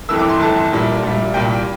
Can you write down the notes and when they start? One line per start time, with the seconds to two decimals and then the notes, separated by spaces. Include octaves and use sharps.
0.09 G1 F2 E3 A3 E6
0.19 D6
0.29 C6
0.39 G1 F2 E3 A3 A5
0.72 A#1 A#2 G3
1.03 A#1 A#2 G3
1.34 C2 A#2 G3 G5